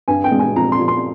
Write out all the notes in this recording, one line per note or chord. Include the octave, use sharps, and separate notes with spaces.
G2 G#5
G5
G#3
G#5
F3 A#5
C6
F3
C6